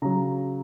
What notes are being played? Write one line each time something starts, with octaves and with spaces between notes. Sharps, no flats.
C#3 F#3 A#5